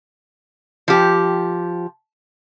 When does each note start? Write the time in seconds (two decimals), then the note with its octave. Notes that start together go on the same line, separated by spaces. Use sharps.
0.88 F3 G4